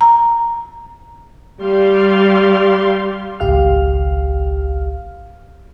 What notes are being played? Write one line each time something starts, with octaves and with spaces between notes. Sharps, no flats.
A#5
G3 F5 C6
G#1 C#2 G4 F5 F6